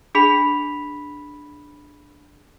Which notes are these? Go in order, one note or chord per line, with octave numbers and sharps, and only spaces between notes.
D4 G#4 B5 B6 F7